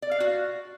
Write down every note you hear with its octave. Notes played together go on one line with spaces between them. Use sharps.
D5
F5
F#4